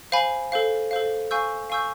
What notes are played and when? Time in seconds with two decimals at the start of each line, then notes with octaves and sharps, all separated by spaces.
0.12 C5 F5 G#5 B5
0.52 A4 C5 F5
0.91 A4 C5 F5
1.31 F5 G#5 C#6 E6 G6
1.70 F5 G#5 C#6 E6 G6